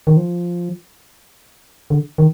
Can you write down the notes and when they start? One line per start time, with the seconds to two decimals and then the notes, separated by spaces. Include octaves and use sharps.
0.07 D#3
0.17 F3
1.90 D3
2.18 D#3